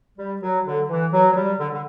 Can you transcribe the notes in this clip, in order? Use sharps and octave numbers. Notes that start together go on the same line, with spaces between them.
G3
F#3
D3
E3
F#3
F#3
G3
D3
D3